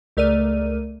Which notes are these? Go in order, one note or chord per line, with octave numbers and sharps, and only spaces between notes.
C#2 A3 A#4 D5 F6 D#7